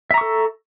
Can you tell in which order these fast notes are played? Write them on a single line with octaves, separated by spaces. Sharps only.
E5 A#5 C#6 A4